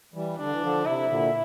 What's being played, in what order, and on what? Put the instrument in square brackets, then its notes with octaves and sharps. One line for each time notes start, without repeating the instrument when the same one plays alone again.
[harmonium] E3 G3
[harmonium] D3 [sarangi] D4
[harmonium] E3
D3 F3
[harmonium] C3 [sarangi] E4
[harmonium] A#2 D3